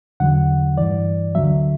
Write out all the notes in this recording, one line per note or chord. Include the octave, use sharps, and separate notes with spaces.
E2 D3 F#3 F#5
G2 E3 D5
D2 D3 F#3 E5